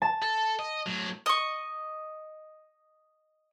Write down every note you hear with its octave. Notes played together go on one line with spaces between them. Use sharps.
A5
A4
D#5
A2 F#3
D#5 C#6